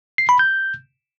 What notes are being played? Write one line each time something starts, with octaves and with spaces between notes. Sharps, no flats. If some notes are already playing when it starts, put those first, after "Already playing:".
C7
B5
G6